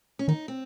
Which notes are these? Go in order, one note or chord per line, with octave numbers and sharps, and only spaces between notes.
C#4
D#3 D#4
C4